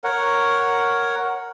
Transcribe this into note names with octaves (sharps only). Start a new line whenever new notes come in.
A#4 C#5 F#5